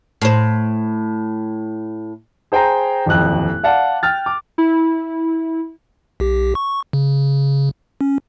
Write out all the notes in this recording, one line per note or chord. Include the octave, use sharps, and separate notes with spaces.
A2 C5
G#4 C5 G5 G#5 A#5
D#1 A1 F2 F#6
D5 F5 F#5 A5
G5 F6 A6
D6
E4
B1 G4
C#6
C#3
C#4